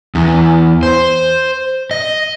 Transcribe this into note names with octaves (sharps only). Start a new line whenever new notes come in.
E2
C5
D#5